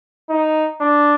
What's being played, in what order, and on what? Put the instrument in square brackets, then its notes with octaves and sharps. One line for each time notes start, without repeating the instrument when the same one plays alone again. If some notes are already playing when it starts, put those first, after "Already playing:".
[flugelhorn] D#4
D4